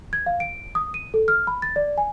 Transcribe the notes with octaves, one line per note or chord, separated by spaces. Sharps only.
G#6
F5
D7
D#6
D#7
A4
F6
B5
A6
D5
G#5